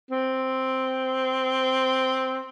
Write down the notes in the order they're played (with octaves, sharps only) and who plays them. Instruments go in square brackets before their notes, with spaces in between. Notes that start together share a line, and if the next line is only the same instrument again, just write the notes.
[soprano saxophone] C4